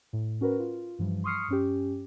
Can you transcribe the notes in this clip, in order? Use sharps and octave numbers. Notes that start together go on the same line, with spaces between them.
A2
C#4 F#4 A#4 B4
F4
G2 E3 F3 G3
C6 C#6 D#6 F6 C7 C#7
G2 C#4 G4